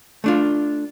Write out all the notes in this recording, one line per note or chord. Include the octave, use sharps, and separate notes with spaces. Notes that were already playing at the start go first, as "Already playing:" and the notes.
A3 D4 F4